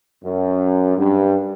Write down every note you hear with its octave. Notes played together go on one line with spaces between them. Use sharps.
F#2
G2